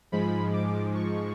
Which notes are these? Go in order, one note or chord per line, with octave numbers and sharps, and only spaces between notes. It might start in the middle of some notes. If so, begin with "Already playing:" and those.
G#2 F3 G#3 B5
D6
C#6